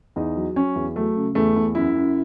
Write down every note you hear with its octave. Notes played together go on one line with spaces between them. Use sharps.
E2 D#4
F#3
F#3 C#4
E2
F#3 A3
C#3
E2 A3
E2
F#2 E4
F#2